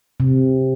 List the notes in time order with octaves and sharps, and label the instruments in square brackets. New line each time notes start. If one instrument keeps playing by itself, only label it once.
[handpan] C3